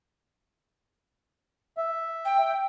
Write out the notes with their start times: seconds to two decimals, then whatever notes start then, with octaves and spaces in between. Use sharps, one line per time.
1.77 E5
2.25 G5